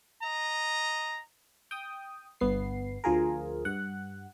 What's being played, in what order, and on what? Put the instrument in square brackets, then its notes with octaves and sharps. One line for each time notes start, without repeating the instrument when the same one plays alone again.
[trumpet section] D#5 A#5
[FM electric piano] G5 D#6
G1 B3 C7
D2 F3 F4 G#4 A#4
G2 F#5 F#6